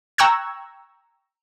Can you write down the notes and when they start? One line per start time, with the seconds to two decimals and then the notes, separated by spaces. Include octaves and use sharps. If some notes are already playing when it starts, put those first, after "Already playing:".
0.18 G5 A#5 C#6 E6 F#6 G#6